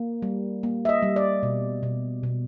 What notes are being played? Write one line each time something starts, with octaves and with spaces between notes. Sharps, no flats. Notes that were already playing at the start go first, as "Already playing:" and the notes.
Already playing: A#3
G3
A#3
E5
D#5
G3
D5
B2
B2
B2